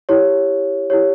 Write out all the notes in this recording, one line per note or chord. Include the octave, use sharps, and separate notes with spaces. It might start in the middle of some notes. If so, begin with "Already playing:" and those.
E4 G4 C#5
E4 G4 C#5